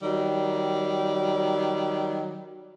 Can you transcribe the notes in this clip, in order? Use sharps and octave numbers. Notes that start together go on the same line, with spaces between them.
D#3 F#3 G3